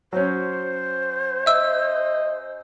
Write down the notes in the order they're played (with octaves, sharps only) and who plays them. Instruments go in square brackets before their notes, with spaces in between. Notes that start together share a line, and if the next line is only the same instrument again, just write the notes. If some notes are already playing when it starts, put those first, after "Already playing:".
[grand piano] F#3 C#4 [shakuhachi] C5
[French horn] D#5 [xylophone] E5 E6